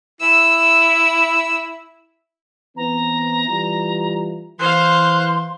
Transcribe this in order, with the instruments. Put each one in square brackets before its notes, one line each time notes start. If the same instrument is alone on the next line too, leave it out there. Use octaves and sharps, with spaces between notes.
[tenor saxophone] E4 [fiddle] E6
[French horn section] E3 B3 C4 [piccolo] A#5
[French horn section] E3 G3 F4
[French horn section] E3 [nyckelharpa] C5 F5 [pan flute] C6 [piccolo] F#6